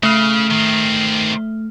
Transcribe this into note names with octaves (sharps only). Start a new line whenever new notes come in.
C#3 A3 F6
D#3 C4